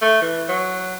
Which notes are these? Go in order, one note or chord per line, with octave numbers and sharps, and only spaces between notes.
A3
E3
F#3